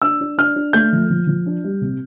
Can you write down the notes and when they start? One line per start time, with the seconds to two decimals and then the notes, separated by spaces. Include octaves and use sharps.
0.02 D4 E6
0.21 D4
0.38 D4 F6
0.56 D4
0.73 A3 G6
0.92 F3
1.10 F3
1.27 F3
1.46 D4
1.64 G3
1.81 C3